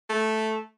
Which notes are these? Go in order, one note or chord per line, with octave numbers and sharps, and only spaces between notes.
A3